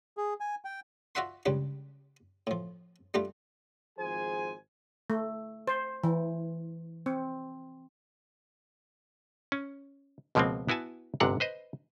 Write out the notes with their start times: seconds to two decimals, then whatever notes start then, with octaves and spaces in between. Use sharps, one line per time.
0.17 G#4
0.40 G#5
0.65 G5
1.15 F4 F#4 D5 E5 F#5 C6
1.46 C#2 C#3 G3 D4 G4
2.47 A2 F3
3.14 G3 A3 D4 F4 G4
3.98 G#1 F3 G#4 C5 G#5
5.10 A3
5.68 C5
6.04 E3
7.06 C4
9.52 C#4
10.35 C#2 B2 F3 G#3 A#3 C4
10.69 B3 E4 F#4 G#5 A5
11.20 G1 G#2 C3 D4 F#5 A#5
11.40 B4 C5 D#5